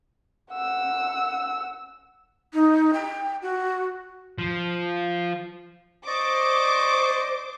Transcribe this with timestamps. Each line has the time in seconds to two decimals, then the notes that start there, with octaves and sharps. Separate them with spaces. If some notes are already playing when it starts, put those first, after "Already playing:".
0.52 F#5 E6
2.54 D#4
2.93 G5
3.42 F#4
4.39 F3
6.07 C5 D5 D#5 C#6 D6